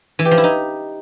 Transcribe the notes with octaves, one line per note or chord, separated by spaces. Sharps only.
E3
G4
F3
E4
D#4